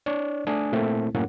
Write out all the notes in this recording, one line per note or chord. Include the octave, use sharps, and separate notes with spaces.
D4 C#5 D5
A3 D4 G#5 D#6
A#2 A3 A#3 C4 E4
F#2 A2 A#3 C#4 F#5